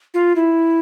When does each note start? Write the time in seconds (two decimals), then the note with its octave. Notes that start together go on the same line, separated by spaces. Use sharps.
0.14 F4
0.36 E4